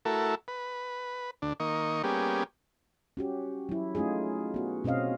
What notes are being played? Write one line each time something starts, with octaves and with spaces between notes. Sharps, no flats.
A3 E4 F#4 A4 A#4
B4
D2 D4
D#3 A#3 D#5 C#6
G3 A#3 B3 C#4 G4 G#4
C#4 F#4 G4
F#3 E4
A3 C#4 D#4 F4 G#4
B3 F#4
B2 C4 C#4 D#5 F5